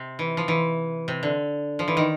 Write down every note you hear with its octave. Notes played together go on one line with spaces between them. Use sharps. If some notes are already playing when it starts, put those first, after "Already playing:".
Already playing: C3
E3
F3
E3
C3
D3
F3
E3
D#3